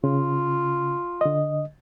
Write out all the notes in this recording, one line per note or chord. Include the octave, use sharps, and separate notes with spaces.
C#3 F4
D3 D#5